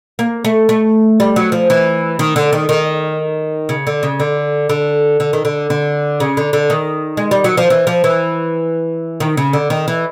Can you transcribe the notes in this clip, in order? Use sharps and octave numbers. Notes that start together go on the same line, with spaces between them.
A#3
A3
A3
G3
F#3
F3
E3
D#3
D3
D#3
D#3
C#3
D3
C#3
D3
D3
D3
D#3
D3
D3
C#3
D3
D3
D#3
G#3
G3
F#3
F3
E3
F3
E3
D#3
C#3
D3
D#3
E3